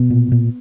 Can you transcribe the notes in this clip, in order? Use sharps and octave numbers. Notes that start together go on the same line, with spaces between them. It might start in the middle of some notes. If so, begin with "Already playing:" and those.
Already playing: B2 B3
A#2
A#2